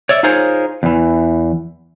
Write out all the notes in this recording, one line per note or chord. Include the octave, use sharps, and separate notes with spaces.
C#5 D5 E5
D#4 F4 G#4 A#4 C5 C#5
E2 E3